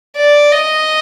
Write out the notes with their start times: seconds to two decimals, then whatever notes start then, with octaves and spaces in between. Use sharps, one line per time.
0.17 D5
0.51 D#5